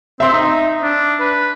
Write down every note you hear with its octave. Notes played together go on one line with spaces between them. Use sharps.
C4 E5 C6
D#4
D4
B4